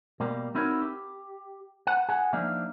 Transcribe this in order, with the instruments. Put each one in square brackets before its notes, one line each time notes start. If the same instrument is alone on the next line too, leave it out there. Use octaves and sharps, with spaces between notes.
[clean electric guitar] B2 G3 A#3
C4 D#4 E4 F#4 A#4 C#5
G4
F#5
G#4 F#5
F3 A#3 D4 D#4 E5 F5